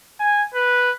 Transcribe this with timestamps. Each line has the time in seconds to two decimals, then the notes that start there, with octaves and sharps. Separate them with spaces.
0.20 G#5
0.54 B4